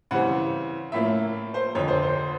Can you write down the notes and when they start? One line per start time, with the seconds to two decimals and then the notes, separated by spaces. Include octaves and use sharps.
0.11 C#3 E3 G3 C4 F#5
0.92 A2 F3 A#3 C#4 E5
1.54 C5
1.75 F2 D3 F3 C#5
1.88 C5
2.02 C5